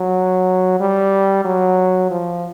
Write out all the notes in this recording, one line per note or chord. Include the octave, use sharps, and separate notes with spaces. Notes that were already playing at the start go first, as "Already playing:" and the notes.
Already playing: F#3
G3
F#3
F3